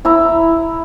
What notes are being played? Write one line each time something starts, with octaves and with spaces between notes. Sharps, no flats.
E4 A#5 E6